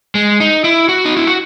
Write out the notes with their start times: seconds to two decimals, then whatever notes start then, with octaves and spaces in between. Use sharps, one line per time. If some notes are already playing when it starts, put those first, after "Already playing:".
0.15 G#3
0.40 D#4
0.64 E4
0.89 F#4
1.05 D#4
1.17 E4
1.27 F#4